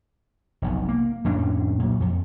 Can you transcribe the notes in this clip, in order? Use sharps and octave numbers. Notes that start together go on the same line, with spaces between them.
F1 B1
A#3
F2 A2 C#4 D4
A#2 F#3
F2